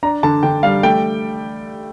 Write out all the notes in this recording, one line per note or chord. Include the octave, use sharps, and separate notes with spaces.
D4 A#5
D3 A5
D3 G5
G3 F5
A3 G5